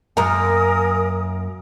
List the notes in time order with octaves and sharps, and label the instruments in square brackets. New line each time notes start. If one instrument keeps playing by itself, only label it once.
[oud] F#2 A#3 [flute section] A#4 G#5 D#6 [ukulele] A#5